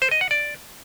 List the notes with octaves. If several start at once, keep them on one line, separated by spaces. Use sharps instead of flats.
C5
D#5
F#5
D5